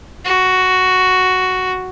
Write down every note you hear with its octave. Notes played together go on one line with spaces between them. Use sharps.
F#4